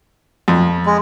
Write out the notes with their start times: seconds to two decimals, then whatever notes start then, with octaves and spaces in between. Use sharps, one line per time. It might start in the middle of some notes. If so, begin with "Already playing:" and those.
0.48 F2
0.86 G#3